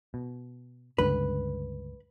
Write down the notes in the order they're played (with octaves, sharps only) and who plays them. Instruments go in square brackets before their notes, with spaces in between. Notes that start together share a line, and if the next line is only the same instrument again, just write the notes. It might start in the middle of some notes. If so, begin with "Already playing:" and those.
[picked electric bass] B2
[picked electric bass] C#2 G2 D3 [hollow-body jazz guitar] B4